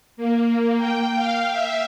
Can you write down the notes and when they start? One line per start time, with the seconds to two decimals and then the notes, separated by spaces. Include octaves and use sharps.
0.17 A#3
0.77 G5
1.16 F5
1.51 E5